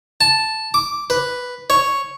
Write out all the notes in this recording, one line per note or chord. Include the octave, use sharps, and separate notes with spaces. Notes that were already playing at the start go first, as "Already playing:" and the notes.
A5
D6
B4
C#5